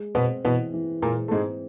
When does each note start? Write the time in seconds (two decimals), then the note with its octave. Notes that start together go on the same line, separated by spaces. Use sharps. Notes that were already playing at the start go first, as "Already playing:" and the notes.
Already playing: G#3
0.15 B2 B3 C4
0.45 B2 E3 B3
0.74 E3
1.02 A#2 G#3 A#3
1.28 A3
1.31 G#2 G#3 C4